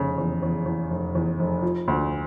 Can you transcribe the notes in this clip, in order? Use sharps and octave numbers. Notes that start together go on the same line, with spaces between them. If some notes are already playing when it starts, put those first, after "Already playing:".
Already playing: F1 C#3
E2
E2
E2
F1
E2
F1
F3
D2